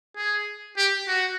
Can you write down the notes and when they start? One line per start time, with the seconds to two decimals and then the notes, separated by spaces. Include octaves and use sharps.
0.17 G#4
0.77 G4
1.08 F#4